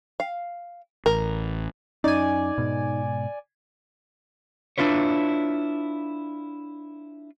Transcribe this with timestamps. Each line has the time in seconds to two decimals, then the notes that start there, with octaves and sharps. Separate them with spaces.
0.20 F5
1.06 A1 A#4
2.04 F#2 C#4 D#4 D5 G#5
2.58 G#2 B2
4.78 D4 E4 F4 B4 C#5